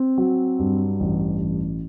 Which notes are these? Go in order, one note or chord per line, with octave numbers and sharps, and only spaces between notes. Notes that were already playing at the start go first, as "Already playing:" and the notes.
Already playing: C4
F#3
G2
A1
A1